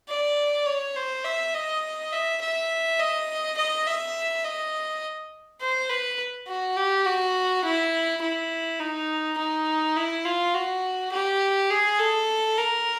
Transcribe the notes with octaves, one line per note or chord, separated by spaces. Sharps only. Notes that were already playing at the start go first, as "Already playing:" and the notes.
D5
C#5
C5
E5
D#5
E5
E5
D#5
D#5
E5
D#5
C5
B4
F#4
G4
F#4
E4
E4
D#4
D#4
E4
F4
F#4
G4
G#4
A4
A#4